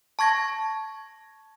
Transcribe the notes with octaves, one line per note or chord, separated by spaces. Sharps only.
A5 C#6 G#6 A#6